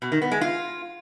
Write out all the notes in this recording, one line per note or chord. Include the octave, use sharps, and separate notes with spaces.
B2
D#3
B3
G#3
F4